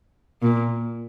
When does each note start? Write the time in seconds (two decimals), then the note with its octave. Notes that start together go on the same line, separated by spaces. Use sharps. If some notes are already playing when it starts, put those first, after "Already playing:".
0.42 A#2